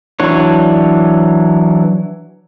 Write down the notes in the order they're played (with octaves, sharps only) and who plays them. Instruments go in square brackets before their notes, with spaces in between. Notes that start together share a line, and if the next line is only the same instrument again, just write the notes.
[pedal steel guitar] E3 F#3 D4 C#5